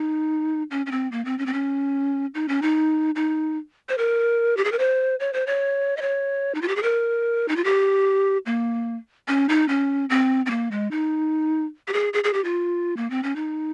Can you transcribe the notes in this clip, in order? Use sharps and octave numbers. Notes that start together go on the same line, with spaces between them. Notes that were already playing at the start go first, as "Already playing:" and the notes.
Already playing: D#4
C#4
C#4
C4
A#3
C4
C#4
C4
C#4
D#4
C#4
D#4
D#4
C5
A#4
G4
G#4
A#4
C5
C#5
C5
C#5
D#5
C#5
D#4
F4
G4
G#4
A#4
D#4
F4
G4
A#3
C#4
D#4
C#4
C4
C4
A#3
G#3
D#4
G4
G#4
G#4
G#4
G4
F4
A#3
C4
C#4
D#4